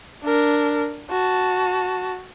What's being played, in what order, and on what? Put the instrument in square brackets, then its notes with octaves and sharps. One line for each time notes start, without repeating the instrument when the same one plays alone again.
[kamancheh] D4 A#4
F#4 A5